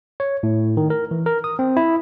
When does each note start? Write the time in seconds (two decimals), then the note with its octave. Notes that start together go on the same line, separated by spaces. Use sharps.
0.20 C#5
0.43 A2
0.77 D#3
0.90 A#4
1.11 E3
1.26 A#4
1.44 D#6
1.59 C4
1.77 E4